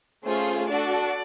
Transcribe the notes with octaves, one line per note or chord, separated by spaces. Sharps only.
A3 C#4 F4 G#4 C5
D4 F#4 A4 D5